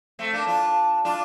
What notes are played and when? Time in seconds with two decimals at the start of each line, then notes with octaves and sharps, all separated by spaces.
0.19 A3 C4
0.33 A#3 D4
0.47 D4 F4
1.05 D4 F4